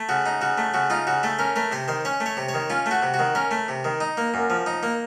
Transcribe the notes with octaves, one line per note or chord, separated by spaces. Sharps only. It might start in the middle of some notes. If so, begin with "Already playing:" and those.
Already playing: A3
C#3 F#4
D#4
C#3 F#4
A3
C#3 F#4
D#4 F4
C#3 F#4
A3 A4
C#4 A#4
A3 A#4
C3 C5
D#3 C5
C#4 C#5
A3
C#5
C3
C#5
D#3
C#4 F4
A3
F#4
C3
F#4
D#3
C#4 A#4
A3
C3
D#3
D#4
A#3
F#2
F3
D#4
A#3